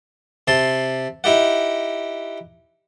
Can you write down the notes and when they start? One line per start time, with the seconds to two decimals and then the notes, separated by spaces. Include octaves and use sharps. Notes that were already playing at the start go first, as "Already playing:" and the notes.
0.48 C3 A5 C6
1.24 D#4 E4 G4 F#5